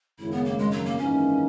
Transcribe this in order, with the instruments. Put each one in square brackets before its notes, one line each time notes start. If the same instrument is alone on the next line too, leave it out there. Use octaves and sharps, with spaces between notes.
[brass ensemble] G#1 F#2 C#3 [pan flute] E4
[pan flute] B3
A#3
G#3
F#3
A#3
[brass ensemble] G#1 F#2 E3 A#3 D#4 [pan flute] C#4